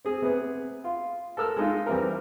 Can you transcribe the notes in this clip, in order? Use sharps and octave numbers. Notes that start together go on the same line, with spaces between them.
C4 G#4
C3 B3 G#4
F4
A4 A#4 E6 F6
G#3 D#4 F4
E3 G3 C4 E4 A#4